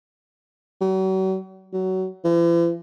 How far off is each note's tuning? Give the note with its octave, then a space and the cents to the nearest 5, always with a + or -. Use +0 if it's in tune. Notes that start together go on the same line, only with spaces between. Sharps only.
F#3 +40
F#3 +20
E3 +45